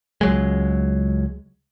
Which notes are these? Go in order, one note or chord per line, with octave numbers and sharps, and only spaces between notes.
C#2 F#3 G#3